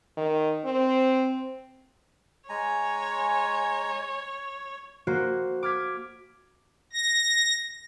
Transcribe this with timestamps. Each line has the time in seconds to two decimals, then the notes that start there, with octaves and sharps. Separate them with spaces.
0.17 D#3
0.65 C4
2.49 G#3 C#5 G#5 A#5
5.07 A#3 F#4 C5
5.63 D6 F6 G#6 B6
6.93 A#6